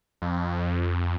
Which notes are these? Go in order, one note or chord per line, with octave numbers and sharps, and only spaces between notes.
F2